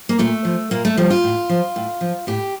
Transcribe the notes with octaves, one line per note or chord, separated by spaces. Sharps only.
A#3
A#2 A3
F3
A#2 A#3
A3
F3 G3
F4
A2
F3
A2
F3
A2 G4